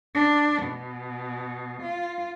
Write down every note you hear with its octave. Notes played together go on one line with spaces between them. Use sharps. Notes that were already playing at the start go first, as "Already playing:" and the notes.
D4
B2
F4